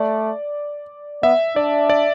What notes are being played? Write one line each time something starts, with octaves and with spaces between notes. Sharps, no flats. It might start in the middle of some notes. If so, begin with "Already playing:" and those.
Already playing: A3 D5
B3 E5
D4 D5
D5